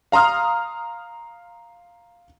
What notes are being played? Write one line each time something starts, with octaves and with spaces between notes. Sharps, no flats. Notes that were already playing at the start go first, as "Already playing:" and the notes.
F5 A#5 C6 D#6 F6